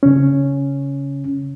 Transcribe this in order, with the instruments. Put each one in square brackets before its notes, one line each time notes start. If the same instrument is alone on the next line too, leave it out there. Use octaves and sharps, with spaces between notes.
[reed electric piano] C#3 C#4